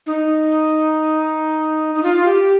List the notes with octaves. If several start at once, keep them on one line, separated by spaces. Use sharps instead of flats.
D#4
D#4
F4
G4